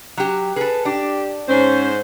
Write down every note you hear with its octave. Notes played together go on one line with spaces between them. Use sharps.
F#3 G4
G#4 A4 B4
D4 G4
G#2 C#4 C5